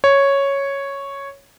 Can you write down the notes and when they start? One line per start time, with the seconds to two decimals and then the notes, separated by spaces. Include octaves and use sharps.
0.04 C#5